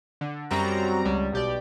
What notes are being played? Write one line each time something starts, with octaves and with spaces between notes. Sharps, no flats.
D3
F#2 G3 C4 F#4 A#5
C#2 G3
B1 G4 D5